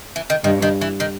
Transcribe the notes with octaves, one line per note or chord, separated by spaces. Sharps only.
E3
D#3
G2 D#3
D#3
E3
D#3